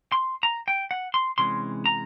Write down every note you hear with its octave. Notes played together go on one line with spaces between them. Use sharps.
C6
A#5
G5
F#5
C6
C3 E3 G#3 C#4 C6
A#5